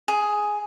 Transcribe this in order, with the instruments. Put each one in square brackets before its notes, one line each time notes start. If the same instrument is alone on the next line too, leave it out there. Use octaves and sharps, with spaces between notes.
[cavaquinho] G#4